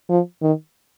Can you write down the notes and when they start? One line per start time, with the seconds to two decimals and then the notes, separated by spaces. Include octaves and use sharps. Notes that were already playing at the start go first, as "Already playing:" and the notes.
0.10 F3
0.42 D#3